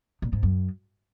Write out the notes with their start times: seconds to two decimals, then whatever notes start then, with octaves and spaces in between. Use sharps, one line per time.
0.22 A#2
0.33 G#2
0.43 F#2